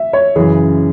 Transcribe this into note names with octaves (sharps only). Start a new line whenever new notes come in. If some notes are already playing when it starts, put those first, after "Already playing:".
Already playing: E5
C#5
F#2 C#3 E3 G#4